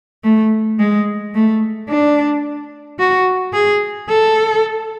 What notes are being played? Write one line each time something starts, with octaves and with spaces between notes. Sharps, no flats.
A3
G#3
A3
D4
F#4
G#4
A4